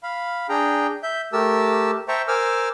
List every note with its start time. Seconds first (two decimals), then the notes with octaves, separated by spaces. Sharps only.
0.03 F5 B5
0.49 D4 G#4 G5 A#5
1.03 E5 G6
1.33 A3 G4 A#4 A5 E6
2.08 C5 E5 G5 A5 A#5 C#6
2.28 A#4 C5 G#5 D6 E6 F6